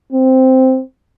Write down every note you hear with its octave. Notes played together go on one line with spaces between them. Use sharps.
C4